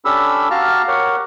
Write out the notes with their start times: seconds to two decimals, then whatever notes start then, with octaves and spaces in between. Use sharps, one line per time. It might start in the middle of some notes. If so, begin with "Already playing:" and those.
0.05 C#4 D4 G4 A4 B5 E6
0.51 F#4 G4 F5 A5 A#5 F6
0.88 G4 A#4 C#5 F#5